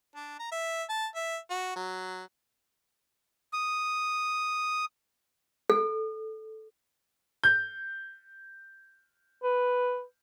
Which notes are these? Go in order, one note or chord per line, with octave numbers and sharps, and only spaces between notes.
D4
A#5
E5
A5
E5
F#4
F#3
D#6
A4
G6
B4